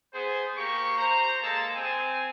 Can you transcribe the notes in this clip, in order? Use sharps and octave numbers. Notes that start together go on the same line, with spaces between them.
B3 G#4 C5
A#3 G4 C#6
C5 A#5
G#3 A#3 A4 A5
C4 G#5